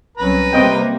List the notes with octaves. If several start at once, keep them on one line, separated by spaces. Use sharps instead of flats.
C2 F#3 C#4 B4 A#5
C3 G3 A#3 C4 D#5 G5